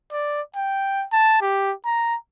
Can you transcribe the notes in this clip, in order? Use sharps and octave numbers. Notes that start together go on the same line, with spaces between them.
D5
G5
A5
G4
A#5